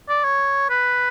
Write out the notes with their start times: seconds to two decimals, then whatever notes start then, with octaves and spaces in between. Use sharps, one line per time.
0.09 D5
0.24 C#5
0.70 B4